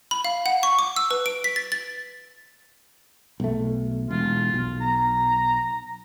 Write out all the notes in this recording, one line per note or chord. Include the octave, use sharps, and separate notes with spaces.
B5
F5
F#5
C#6
D6
E6
B4
D7
B6
A6
A6
B1 A3
E1 F4
B1
A#5